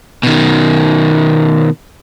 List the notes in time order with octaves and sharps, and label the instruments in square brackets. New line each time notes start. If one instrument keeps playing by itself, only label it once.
[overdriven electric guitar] B2 D#3